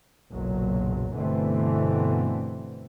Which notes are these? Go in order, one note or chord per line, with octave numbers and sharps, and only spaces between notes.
F#1 B1 A#2 F#3
G1 B2 D3 E3 A3 C4